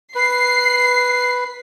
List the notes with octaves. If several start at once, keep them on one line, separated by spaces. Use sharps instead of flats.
B4 C7